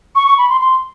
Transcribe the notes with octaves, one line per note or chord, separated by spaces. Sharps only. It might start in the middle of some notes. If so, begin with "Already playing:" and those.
C#6
C#6
B5
C6
C6